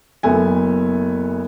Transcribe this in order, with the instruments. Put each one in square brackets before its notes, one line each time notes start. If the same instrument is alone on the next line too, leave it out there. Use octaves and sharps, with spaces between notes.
[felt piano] F#1 A3 B3 G#5